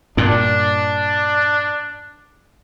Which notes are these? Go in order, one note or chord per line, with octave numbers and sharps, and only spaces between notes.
G2 A#2 D4